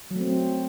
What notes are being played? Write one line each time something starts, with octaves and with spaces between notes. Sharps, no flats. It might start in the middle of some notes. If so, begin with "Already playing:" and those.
F#3 A3 C4